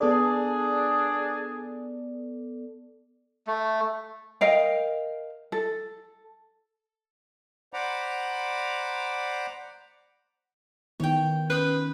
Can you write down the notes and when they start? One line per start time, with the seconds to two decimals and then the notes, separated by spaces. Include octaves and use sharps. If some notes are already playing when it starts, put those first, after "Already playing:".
0.01 B3 D4 G#4 A4 D5
3.47 A3
4.41 A#4 D#5 F5 G5
5.52 A4
7.73 C5 D5 F#5 A#5 B5 D6
11.00 D#3 B3 E4 C#5 G5
11.50 C#4 B4 C5 D#6